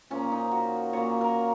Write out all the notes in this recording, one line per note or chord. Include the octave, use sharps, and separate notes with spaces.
A#2 F3 A#3 C#4
D#4
F#4
A#2 F#3 A#3 C#5
A#4